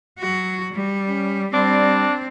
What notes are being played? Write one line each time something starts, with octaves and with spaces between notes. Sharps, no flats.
F#3 F#4
G3
C#4
G3 C4 D4